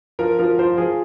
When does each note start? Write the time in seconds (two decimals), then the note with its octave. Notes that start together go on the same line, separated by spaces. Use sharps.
0.19 F3 A#4
0.39 F3 A#4
0.59 F3 C5
0.78 F3 G#4